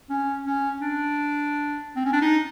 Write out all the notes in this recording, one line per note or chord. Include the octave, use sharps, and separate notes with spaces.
C#4
C#4
D4
C4
C#4
D4
D#4